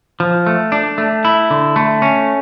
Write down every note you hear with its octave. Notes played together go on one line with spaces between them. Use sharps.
F3
A3
D4
A3
E4
D3
A3
C#4